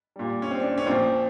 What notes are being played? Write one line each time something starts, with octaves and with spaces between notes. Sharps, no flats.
A#2 G3
C#4
C4
D4
C#4
A#2 F3 C4